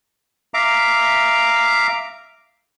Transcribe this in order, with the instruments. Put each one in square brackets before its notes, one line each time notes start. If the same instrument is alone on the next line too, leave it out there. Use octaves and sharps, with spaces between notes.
[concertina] E5 F5 A#5 D6